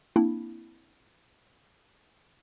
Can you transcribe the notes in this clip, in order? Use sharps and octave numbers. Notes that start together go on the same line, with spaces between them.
A#3 C4 D4 E4